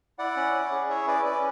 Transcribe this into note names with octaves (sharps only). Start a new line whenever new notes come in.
E4 D5 F#5
C#4
C#4
G#4
E4 C#5 E5
C#4 B4 D5
C#4 B4 D5